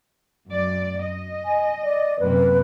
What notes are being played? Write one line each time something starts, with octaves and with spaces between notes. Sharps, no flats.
F#2 D5
D#5
G#5
D5
F#2 C3 A#3 B4